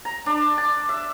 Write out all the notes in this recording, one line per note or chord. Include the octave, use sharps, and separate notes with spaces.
A#5
D4
A5
E5